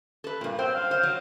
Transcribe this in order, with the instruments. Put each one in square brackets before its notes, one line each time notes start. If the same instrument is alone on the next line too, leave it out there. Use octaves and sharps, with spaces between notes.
[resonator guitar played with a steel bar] A4 B4
G2 A#2
[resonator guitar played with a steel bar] F#3 C5 G5 [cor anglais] C4
[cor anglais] F5
[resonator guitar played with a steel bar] C5
F#3